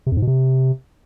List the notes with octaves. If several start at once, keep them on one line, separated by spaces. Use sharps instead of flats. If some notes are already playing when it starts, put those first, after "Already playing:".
C3
F2
G#2
B2
C3